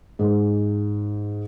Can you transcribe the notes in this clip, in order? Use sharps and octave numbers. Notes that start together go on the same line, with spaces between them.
G#2